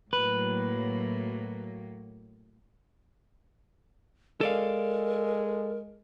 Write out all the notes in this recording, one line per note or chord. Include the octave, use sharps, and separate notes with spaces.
A2 F#3 A#3 B4
G#3 A4 A#4 D5 F5